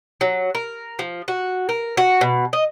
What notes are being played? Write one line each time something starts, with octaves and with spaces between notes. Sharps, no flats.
F#3
A#4
F3
F#4
A#4
F#4
B2
D#5